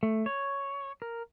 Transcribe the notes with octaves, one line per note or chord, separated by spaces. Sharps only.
A3
C#5
A#4